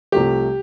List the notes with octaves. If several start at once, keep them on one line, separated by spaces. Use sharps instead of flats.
C2 C3 F3 A3 G4